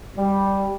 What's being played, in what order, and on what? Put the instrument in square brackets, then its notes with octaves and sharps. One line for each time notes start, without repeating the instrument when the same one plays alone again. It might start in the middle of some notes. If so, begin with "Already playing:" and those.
[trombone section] G3